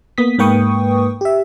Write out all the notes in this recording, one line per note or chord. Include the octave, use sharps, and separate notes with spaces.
A#3 B3 D#6 B6
G#2 A#3 B4 G5 C#6 D#6
G4 E5